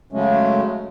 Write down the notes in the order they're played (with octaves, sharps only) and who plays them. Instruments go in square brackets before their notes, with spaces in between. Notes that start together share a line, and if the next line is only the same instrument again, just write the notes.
[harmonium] C#3 F#3 G#3 A3 C#4